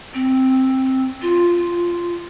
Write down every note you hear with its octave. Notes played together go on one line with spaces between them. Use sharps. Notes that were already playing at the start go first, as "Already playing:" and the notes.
C4
F4